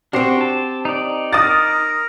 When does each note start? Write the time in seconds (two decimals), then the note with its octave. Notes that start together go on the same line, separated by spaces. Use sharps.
0.13 C4 D4 F#4 G4 C5
0.41 A5
0.85 D#4 D5
1.33 A#4 D#6 A6